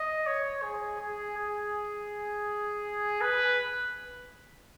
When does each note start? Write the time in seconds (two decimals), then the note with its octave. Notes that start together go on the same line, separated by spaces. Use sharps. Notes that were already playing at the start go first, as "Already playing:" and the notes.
Already playing: D#5
0.26 C#5
0.62 G#4
1.00 G#4
1.37 G#4
3.21 B4